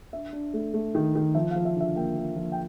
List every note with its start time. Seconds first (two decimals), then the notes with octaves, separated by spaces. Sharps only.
0.13 D4 E5
0.33 D4
0.54 A3
0.74 A3
0.95 D#3
1.15 D#3
1.34 F3 E5
1.51 F3 F5
1.65 E5
1.76 D3 E5
1.96 A#3 G5
2.17 A#3
2.36 F3
2.52 G5